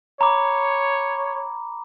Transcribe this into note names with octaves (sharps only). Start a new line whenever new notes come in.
C#5 A#5 B5 D6